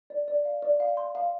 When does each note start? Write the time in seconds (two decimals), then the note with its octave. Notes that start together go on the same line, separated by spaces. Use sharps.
0.10 D5
0.28 D5
0.45 F5
0.62 D5
0.80 F5
0.97 C6
1.15 F5